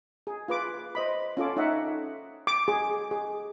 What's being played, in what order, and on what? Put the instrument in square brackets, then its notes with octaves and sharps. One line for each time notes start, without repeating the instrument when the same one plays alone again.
[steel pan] G#4
F4 B4 D6
C5 D#5 B5
C#4 F4 A4 D6
D#4 C#5 D#5 E5 F#5
D6
G#4
G#4